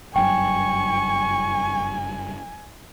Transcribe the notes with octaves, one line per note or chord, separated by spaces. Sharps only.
F#1 G2 F#3 G5 G#5 C#6